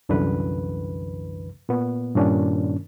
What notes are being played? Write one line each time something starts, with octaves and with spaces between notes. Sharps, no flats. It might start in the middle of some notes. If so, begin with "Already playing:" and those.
C2 F#2 D3 E3 B4
A#2 B3
G2 A#2 D#3 C#4 D4